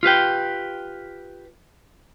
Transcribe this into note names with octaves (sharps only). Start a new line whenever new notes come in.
F4 G4 B4 G5